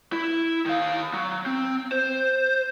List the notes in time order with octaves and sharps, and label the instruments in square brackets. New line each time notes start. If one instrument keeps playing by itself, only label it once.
[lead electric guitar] E4 E5
D#3 F5
F#3
C4
C5